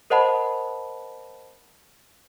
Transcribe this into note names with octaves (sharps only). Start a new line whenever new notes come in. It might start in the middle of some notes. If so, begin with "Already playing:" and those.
A#4 C5 D#5 F#5 A5 B5